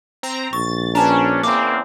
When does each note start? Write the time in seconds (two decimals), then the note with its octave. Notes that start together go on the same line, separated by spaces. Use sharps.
0.23 C4 A#5
0.53 A#1 C#6 A6
0.95 C#4 D4 B4 A5 A#5
1.44 E2 C#3 A#3 C4 D6